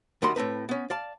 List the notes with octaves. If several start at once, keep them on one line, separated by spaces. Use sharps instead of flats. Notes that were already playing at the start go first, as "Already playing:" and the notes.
F#2 D#3 G3 F#5 B5 C6
A2 C4 D#4 B4
B3 C#4
D5 F5 A5